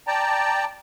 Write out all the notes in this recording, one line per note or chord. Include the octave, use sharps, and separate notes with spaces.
D5 G5 A5 A#5